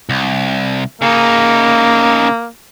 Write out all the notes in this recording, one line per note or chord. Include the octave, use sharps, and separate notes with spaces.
C2
C#3 A#3 D#4